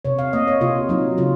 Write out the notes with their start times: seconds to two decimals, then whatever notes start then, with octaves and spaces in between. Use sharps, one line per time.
0.05 C3 C#5
0.19 F5
0.33 A#3 D#5
0.47 C#5
0.61 C3 F4
0.89 F#3 D#4
1.18 C#3 F4